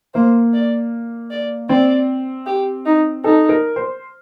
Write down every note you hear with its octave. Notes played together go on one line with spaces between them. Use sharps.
A#3 C5
D5
D5
C4 D5
G4
D#4
D#4 A4
A#4
C5